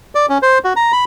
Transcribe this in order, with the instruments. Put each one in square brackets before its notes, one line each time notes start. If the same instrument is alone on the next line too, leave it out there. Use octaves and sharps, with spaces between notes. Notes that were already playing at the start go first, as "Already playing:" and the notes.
[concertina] D5
C#4
C5
F#4
A#5
B5